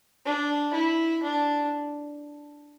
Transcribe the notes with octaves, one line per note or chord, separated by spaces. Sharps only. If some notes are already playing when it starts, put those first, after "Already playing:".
D4
E4
D4